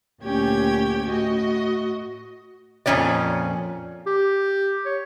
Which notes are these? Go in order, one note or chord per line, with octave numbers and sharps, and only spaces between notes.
D2 A#2 C#4 G4 G5 G#6
A2 F#4 D#5
F2 A#2 C#4 C#5 D5
G4
C#5